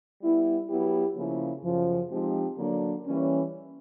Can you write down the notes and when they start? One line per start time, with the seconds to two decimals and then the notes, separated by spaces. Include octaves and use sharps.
0.21 G3 B3 E4
0.69 F#3 B3 E4 G4
1.16 C#3 F3 A#3 C#4 E4
1.63 F#2 C#3 F3
2.10 F3 G#3 C4 D#4 G4
2.58 D3 F#3 A#3 D4
3.05 E3 G3 A#3 C#4